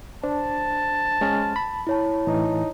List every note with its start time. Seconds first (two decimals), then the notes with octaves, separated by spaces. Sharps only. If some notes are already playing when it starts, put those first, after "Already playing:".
0.24 D4 C5 A5
1.21 G#3 C#4 F6
1.56 B5
1.87 E4 C#5 A5
2.27 A2 E3 D#4